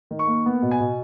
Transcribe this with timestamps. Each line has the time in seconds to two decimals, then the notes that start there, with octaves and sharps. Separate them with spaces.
0.11 D#3
0.19 C#6
0.27 A#3
0.46 B3
0.62 B2
0.71 G#5
0.80 B2